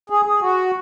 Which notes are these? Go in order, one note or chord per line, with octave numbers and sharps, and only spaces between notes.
G#4
G#4
F#4